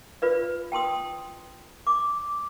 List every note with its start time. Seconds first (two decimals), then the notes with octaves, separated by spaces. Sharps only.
0.22 F4 B4 D5
0.72 G5 A5 C6 D#6
1.87 D6